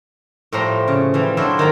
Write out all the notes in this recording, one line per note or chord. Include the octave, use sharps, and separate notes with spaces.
A2 F3 G3 C5 A#5 C6
C#3
E3 F3 G3
F#3 A3 D4 E4 F4 C5
G#2 D#3 F5 G5 A#5